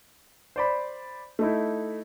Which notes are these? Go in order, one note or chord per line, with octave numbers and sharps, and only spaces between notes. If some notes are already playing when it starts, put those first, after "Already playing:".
C5 D5 B5
A3 D#4 E4